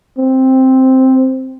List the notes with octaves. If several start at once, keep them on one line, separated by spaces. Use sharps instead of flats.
C4